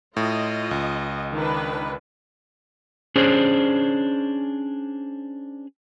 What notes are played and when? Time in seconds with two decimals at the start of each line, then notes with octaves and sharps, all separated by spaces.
0.17 A2 F4 D#5
0.71 C#2
1.32 D#3 D4 B4
3.16 C#4 D4 G#4 C5